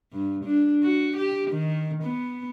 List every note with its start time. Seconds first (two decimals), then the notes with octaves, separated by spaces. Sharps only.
0.13 G2
0.45 D4
0.83 F#4
1.17 G4
1.51 D#3
2.03 B3